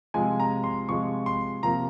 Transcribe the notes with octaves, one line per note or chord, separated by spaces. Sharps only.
C3 F3 G#3 G#5
A#5
C6
C3 F3 G#3 C#6
C6
C3 F3 A#3 A#5